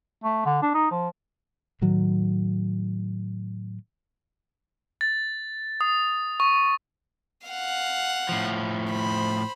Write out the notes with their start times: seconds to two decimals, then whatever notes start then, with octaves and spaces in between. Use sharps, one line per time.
0.24 A3
0.46 D3
0.62 D4
0.74 D#4
0.91 F3
1.81 A2 D#3 F#3
5.01 A6
5.81 D#6
6.40 C#6
7.47 F5 F#5
8.29 A2 F3
8.92 C5 B5